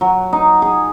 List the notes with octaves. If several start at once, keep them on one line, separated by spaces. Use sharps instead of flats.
F#3
D#4
G#4